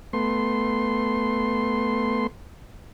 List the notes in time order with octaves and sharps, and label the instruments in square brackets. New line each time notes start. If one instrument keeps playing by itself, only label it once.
[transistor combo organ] A3 B3 C6